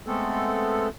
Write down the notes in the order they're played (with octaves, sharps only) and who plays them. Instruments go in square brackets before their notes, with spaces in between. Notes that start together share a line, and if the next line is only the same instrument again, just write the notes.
[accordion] G#3 A3 B3 C4 A4